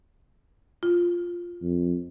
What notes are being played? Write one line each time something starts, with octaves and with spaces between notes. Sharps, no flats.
F4
F2